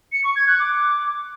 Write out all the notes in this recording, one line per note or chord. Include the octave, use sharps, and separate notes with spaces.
C#7
C#6
G#6
F#6
D6